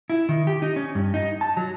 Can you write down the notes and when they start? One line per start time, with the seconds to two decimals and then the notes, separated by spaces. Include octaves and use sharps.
0.10 E4
0.29 D#3
0.47 G4
0.62 D#4
0.76 C#4
0.95 G2
1.14 D#4
1.41 A5
1.57 F#3